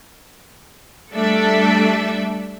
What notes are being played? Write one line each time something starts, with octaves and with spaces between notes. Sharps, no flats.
G3 A3 D4 A4 D5 E5